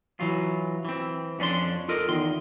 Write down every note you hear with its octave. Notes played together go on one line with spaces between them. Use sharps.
E3 F#3 F4
E3 C4
F2 C#4 D4 D5 C6
F4 A4 A#4 D#5
E2 D#3 C6